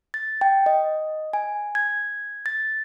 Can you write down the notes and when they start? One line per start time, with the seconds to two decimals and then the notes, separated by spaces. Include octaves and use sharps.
0.14 A6
0.41 G5
0.66 D#5
1.33 G#5
1.75 G#6
2.46 A6